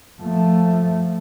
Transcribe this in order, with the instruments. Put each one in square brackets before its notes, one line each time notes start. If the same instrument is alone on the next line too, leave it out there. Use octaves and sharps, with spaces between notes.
[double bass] F3 A3